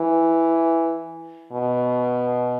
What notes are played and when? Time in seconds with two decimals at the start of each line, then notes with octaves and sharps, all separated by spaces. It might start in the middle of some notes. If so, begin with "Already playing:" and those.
Already playing: E3
1.52 B2